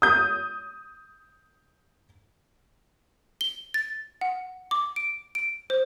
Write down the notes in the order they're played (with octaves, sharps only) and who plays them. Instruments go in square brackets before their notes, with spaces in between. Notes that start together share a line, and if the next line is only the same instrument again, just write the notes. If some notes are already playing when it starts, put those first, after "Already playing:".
[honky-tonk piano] D#6 G6
[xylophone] G7
A6
F#5
D6
D7
D7
C5